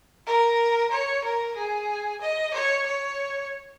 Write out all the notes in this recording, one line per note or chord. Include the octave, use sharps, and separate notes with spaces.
A#4
C#5
A#4
G#4
D#5
C#5
C#5